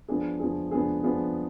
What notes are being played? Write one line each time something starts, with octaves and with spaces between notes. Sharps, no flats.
F3 B3 D4 G#4
F3 B3 D4 G#4
F3 B3 D4 G#4
F3 B3 D4 G#4